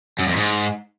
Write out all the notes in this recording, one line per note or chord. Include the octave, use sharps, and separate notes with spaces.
F#2
F2
G#2